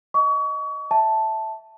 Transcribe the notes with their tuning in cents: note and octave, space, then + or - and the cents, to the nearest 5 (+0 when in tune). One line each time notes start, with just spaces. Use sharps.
D#5 +0 C#6 +35
E5 -10 A5 +0